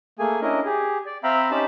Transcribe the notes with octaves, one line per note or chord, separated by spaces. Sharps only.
A3 A#3 G#4 G#5
C#4 D4 E4 A#4 D#5
G4 G#4
D5
C4 E5 F5 G5 A#5 B5
C#4 D#4 G4 C5 A5 B5